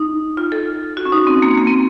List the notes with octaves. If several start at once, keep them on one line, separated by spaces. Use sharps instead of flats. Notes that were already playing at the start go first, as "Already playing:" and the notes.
Already playing: D#4
F4
A4
F#4
C#4
D#4
C4
A#3
A#3
C4